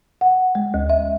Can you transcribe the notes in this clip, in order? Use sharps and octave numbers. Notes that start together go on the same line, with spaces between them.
F#5
G#3
D2
E5